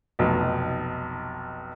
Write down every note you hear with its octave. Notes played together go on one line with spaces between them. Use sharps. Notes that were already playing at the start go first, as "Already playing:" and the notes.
F1 B1